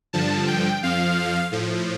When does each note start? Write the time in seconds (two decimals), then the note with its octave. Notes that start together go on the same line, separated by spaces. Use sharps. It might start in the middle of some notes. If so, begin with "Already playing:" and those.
0.13 G2 D3 F3 A5
0.47 G5
0.83 F2 F3 F5
1.52 A2 F3